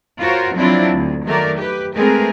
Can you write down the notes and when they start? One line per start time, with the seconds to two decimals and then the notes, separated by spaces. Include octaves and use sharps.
0.20 F4 F#4 A#4 C5 C#5
0.55 F3 F#3 C4 D4 E4 F4
0.93 D2
1.25 D#3 F#3 A3 A#4 D5
1.57 G4 B4
1.95 G#3 A3 C4 G#4 A#4 B4